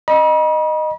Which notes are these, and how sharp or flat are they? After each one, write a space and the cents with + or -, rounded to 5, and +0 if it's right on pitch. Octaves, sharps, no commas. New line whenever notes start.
D#5 -10 B5 -45